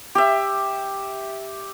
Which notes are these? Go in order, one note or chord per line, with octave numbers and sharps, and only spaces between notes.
G4 E5